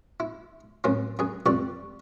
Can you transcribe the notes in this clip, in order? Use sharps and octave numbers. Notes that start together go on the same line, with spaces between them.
E4
F#2 A2 C4 C#4
F#2 G#4
C2 F2 G3 D5 C#6